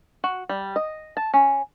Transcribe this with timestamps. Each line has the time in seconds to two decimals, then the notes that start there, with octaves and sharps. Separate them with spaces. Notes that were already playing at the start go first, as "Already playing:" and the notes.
0.24 F#4
0.49 G3
0.76 D#5
1.17 A5
1.34 C#4